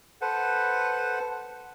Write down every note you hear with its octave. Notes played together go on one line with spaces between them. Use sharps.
A4 B4 C5 F#5